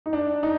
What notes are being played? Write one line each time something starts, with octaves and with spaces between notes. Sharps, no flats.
D#4
D4
D#4